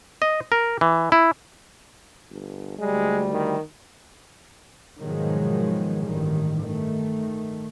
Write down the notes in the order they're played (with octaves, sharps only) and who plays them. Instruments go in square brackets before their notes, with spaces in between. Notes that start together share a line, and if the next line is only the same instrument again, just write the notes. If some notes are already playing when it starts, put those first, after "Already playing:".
[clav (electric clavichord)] D#5
A#4
E3
E4
[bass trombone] G1
[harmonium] D2 G3 [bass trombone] G#3
[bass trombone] D#3
[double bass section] G#2 B2 D#3 F3 F#3 G#3
A1 G2 D#3
D#3 A3